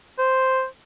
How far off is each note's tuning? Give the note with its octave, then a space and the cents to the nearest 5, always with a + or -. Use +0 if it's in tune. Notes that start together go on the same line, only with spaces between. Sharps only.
C5 +0